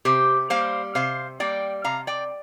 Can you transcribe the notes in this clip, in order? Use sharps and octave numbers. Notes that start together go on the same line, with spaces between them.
C3 G4 C5
G3 A#3 C5 F5
C3 C5 F5
G3 A#3 D5 G5
C3 F5 A#5
D5 G5